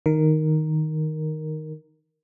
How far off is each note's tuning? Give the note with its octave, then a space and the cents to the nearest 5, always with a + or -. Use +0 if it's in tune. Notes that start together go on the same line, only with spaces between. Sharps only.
D#3 +0 A#4 +0